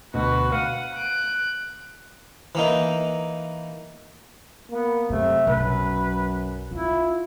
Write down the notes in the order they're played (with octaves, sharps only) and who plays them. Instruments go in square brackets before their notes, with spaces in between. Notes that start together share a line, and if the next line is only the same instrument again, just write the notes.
[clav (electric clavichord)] D2 B2 [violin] F#4 B4
[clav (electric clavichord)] F5 [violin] F#5 D#7
[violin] F#6 D7
[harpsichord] E3 A#3 D#4
[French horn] A#3 [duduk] B3
[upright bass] F#2 [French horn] C3 [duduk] A3
[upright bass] B1 [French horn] F#2 [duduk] B4
[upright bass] C#4 [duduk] E4 [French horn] F4